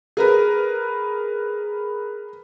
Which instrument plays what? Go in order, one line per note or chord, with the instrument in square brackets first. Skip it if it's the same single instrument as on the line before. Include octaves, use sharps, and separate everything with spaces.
[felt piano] G#4 A#4 B4